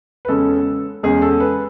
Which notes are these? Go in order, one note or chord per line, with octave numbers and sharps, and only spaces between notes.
B4
E2 C#3 G#3 C#4 A4
E2 C#3 G#3 C#4 G#4
A4
B4